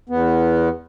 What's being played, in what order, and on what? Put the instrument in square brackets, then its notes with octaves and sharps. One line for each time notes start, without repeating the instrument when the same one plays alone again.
[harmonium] E2 B3